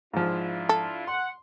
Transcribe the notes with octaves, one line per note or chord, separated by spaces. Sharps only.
G#2 F3 D4 E4 F4
A4
F#5 C6